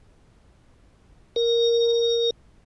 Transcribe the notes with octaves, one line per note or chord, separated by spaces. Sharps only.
A#4